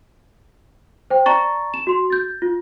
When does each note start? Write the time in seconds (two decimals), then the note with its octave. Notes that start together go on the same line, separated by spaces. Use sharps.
1.10 C5 G5
1.26 D5 A5 A#5 C#6 A6
1.74 E7
1.87 F#4 C6
2.10 G6 A6
2.42 F4